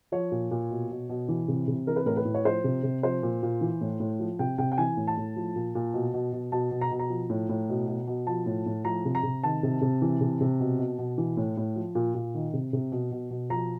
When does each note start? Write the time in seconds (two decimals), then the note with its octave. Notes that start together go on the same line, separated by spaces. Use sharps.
0.12 F3 C#5
0.32 A#2
0.51 A#2
0.70 B2
0.90 B2
1.09 B2
1.29 E3
1.48 C3
1.68 C3
1.87 E3 A#4
1.96 B4
2.06 A2 A#4
2.17 B4
2.25 A2
2.35 C#5
2.45 F3 C5
2.64 C3
2.83 C3
3.03 F3 C5
3.23 A#2
3.43 A#2
3.61 E3
3.81 A2
4.00 A2
4.20 F3
4.39 C3 G5
4.58 C3 G5
4.72 G5
4.78 E3 G#5
4.97 A2
5.07 A5
5.17 A2
5.36 F3
5.56 A#2
5.75 A#2
5.94 B2
6.14 B2
6.33 B2
6.52 B2 A5
6.71 B2
6.81 A#5
6.91 B2
6.99 A#5
7.10 F3
7.30 A2
7.49 A2
7.69 B2
7.88 B2
8.07 B2
8.27 F3 A5
8.46 A2
8.66 A2
8.84 F3 A#5
9.05 C3
9.15 A#5
9.23 C3
9.43 D#3 A5
9.63 C3
9.81 C3
10.02 E3
10.21 C3
10.41 C3
10.60 B2
10.79 B2
10.99 B2
11.18 E3
11.37 A2
11.57 A2
11.76 F3
11.95 A#2
12.15 A#2
12.35 D#3
12.54 C3
12.73 C3
12.92 B2
13.12 B2
13.30 B2
13.50 F3 A#5